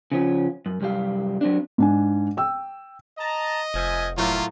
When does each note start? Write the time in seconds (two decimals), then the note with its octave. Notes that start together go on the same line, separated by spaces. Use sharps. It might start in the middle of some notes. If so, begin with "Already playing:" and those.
0.12 C#3 F3 C#4
0.66 F#2
0.81 C2 F#2 G3 G4 F5
1.41 F#3 C4 D4
1.78 G#2 D4 G#5
2.37 G5 E6
3.18 D#5 A5 A#5
3.74 F1 F3 E5 G#5
4.18 A2 F#3 A3 A#3 F4